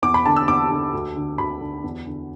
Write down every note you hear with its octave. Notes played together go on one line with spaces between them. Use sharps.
E2 D6
B5
D3 A5
E6
E2 D6
D3
D2
D3
D2 B5
D3
E2
D3